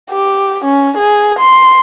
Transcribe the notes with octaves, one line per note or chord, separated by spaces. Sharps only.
G4
C#4
G#4
C6